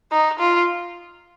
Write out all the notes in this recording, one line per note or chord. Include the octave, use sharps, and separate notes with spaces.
D#4
F4